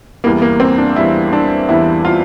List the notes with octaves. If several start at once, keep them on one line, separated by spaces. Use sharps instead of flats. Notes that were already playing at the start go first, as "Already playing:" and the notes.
E2 E3 G3 A#3
A#3
C4
D4
E2 E3 G3 E4
D4
E2 E3 G3 E4
F4